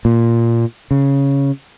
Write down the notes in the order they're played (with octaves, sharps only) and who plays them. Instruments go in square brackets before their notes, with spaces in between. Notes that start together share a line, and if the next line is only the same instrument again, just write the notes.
[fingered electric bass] A#2
C#3